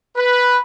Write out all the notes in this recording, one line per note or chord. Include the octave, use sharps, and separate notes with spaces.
B4